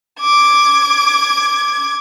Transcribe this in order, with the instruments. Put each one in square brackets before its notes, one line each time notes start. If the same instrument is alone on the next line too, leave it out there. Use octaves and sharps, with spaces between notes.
[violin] D6 G#6